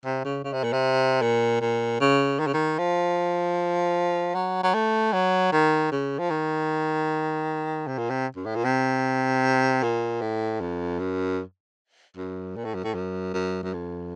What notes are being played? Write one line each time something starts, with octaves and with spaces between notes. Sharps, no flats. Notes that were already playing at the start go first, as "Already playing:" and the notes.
C3
C#3
C#3
C3
A#2
C3
A#2
A#2
C#3
D#3
C#3
D#3
F3
F#3
F#3
A3
F#3
D#3
C#3
F3
D#3
C3
A#2
C3
F#2
A2
A#2
C3
A#2
A2
F2
F#2
F#2
A#2
A2
F#2
A2
F#2
F#2
F#2
F2